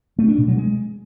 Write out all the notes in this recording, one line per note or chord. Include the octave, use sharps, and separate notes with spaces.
A3
D4
B2
F#3
G#3